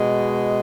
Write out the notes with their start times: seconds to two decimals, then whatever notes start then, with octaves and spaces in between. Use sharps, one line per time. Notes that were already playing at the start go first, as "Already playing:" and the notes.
Already playing: B2 G#3